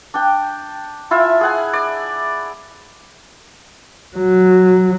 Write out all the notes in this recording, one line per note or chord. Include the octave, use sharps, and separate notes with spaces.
D4 G5
E4 F4 E5 G#5
G#4 F#5 G#5
D5
F#3